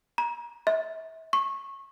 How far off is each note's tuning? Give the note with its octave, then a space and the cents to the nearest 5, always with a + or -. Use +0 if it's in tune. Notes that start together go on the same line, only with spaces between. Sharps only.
A#5 +30
E5 -35
C#6 -20